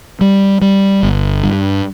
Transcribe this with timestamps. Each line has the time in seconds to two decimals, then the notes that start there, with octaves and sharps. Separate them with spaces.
0.21 G3
0.62 G3
1.03 G1
1.43 G2